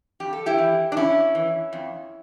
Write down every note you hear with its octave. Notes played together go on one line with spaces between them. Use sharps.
F2 G4
A4
E4 G4
E3
D4
F2 C#4 E4
E3
F2